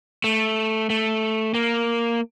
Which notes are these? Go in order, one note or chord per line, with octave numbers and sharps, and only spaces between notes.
A3
A3
A#3